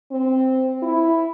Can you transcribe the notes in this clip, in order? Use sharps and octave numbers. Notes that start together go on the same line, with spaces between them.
C4
E4